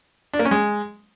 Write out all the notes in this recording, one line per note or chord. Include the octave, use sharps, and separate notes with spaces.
D4
A#3
C#4
G#3